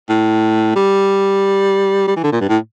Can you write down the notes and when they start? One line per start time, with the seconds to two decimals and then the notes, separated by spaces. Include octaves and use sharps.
0.09 A2
0.75 G3
2.07 G3
2.16 E3
2.23 D3
2.32 A#2
2.40 G2
2.49 A2